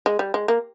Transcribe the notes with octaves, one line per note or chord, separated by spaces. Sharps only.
G#3
G3
G#3
A#3